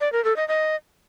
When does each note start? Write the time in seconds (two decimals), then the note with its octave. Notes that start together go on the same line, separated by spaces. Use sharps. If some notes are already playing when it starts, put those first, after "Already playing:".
0.01 D5
0.13 A#4
0.24 A4
0.36 D#5
0.48 D#5